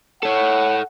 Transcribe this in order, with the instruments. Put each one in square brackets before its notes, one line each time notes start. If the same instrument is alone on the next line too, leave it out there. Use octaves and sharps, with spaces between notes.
[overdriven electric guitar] A4 C#5 [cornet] F#5